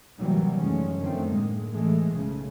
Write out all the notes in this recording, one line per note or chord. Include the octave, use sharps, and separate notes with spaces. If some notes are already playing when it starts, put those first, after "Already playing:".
D#2 A2 C3 E3 F#3 G3
F#1 F#2 D#3 G#3 A3 C#4
F2 D3 D#3 A3 C4
A2 G#3 A#3
A1 A2 E3 G#3 A3
B1 C#3 A3